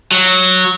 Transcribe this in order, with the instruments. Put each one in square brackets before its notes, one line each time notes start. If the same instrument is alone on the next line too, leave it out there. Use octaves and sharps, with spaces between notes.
[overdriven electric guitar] F#3